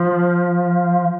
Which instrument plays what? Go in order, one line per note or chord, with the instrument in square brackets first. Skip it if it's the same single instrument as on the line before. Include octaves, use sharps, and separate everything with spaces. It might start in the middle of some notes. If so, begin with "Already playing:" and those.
Already playing: [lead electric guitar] F3